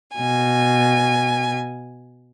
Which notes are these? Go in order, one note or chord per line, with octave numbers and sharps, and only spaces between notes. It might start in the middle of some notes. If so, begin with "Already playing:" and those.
B2 G#5